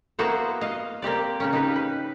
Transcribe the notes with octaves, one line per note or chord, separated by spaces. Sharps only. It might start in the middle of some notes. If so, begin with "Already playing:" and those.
A#3 B3 E4 F#4 G#4 C5
D#5 F5
A#3 C4 G4 D5
C#3 A#3 C#4
D#4 G4 B4
B4